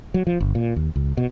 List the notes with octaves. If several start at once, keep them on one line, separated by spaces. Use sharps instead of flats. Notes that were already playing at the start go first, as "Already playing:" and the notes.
F#3
F3
G1
A#2
D#2
C#2
B2